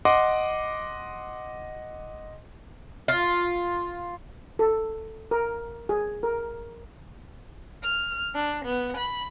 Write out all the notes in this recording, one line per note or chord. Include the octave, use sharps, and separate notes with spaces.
D#5 F#5 C6 D6
F4
A4
A#4
G#4
A#4
F6
D4
B3
B5